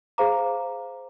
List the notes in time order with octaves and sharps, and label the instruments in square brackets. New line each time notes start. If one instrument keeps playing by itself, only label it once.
[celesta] G#4 C5 F5 A#5 D6